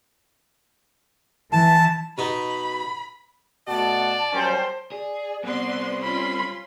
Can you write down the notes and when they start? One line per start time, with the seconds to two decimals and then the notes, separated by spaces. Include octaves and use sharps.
1.53 E3 A5
2.18 B2 D#4 B5
3.68 B2 A3 F#4 D5 A5
4.33 F#3 G3 C#4 C5 G5
4.92 G#4 D5
5.45 G3 B3 C4 B4 C6
6.03 C#4 F4 B5 C6